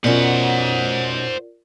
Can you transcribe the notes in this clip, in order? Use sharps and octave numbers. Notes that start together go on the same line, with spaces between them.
B2 C#4 F4 A#4 C5 D5 F#5